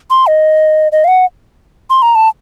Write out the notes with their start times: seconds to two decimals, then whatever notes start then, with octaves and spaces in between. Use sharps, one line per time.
0.10 C6
0.27 D#5
0.92 D#5
1.04 F5
1.08 F#5
1.90 C6
2.02 A#5
2.15 A5